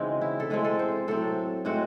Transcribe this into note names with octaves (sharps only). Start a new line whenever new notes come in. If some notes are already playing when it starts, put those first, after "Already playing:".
Already playing: C#3 E3 G#3 C4 D#4 F#4
E4
A4
A2 G#3 C4 G#4
A4
C5
A2 F#3 C4 A4
A2 G#3 C4 F#4